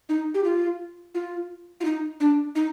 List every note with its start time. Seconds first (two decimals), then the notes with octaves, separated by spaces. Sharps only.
0.09 D#4
0.34 G4
0.44 F4
1.15 F4
1.81 F4
1.85 D#4
2.20 D4
2.55 D#4